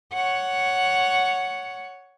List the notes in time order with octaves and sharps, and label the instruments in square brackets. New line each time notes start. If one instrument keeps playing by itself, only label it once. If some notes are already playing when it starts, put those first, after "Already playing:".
[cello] C#5 F#5